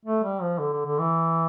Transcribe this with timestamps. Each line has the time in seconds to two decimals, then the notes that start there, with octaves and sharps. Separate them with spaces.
0.06 A3
0.24 G3
0.42 F3
0.59 D3
0.73 D3
0.86 D3
0.99 E3